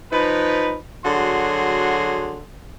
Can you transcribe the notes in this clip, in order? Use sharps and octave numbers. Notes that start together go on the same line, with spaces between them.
F3 D#4 B4
D3 F#3 F#4 G#4 C6